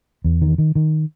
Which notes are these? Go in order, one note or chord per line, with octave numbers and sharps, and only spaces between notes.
E2
D#3
D#3
D#3